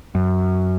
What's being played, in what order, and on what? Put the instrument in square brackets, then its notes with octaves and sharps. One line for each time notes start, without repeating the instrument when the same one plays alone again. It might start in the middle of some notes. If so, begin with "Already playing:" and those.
[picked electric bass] F#2